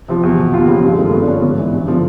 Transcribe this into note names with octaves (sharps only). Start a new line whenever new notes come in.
C3 F3
E2
B2
D#2 F4
C#3 F3
G2
G#3
D#3 A3
A#3
G2 B3
D4
D3 F3 C#4
G#2 B3
E3
G2
D3 F3